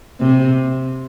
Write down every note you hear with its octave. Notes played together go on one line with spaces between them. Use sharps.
C3